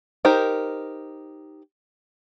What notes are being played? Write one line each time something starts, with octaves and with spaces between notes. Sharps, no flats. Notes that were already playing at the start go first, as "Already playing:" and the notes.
D#4 G4 A#4 C5